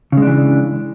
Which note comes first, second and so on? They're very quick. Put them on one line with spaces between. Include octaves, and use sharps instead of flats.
C#3 G#3 D4 E3